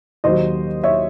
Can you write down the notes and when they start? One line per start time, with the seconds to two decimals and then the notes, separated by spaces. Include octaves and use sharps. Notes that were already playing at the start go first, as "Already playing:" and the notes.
0.24 D#2 D#3 F#3 C5 D#5
0.84 C#5 E5